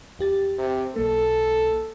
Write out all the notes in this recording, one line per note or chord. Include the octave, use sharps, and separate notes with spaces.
E2 G4 A6
C3
B1 A#3 A4